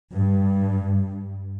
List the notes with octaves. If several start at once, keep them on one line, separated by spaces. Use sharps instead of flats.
G2